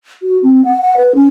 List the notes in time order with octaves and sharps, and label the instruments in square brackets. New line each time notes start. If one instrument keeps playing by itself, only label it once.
[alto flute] F#4
C4
F#5
F#5
B4
C#4